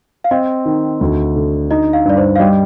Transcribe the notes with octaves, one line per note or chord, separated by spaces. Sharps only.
F5
C4 D#5
D#3
D2
D3
D#4 D#5
F5
G2 D5
C5
F5
G3 D#5